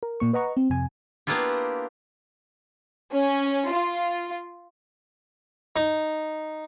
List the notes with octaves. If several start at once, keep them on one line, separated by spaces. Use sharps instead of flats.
A#4
A#2 A#3 C#6
B4 D#5 F#5 A#5 C#6
C4
F2 C3 G#5
A#3 B3 D4 E4 F4 G4
C#4
F4
D#4